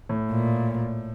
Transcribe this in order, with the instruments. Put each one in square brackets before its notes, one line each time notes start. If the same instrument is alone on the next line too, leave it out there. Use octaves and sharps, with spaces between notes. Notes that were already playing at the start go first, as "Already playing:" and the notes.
[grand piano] A2
[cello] A#2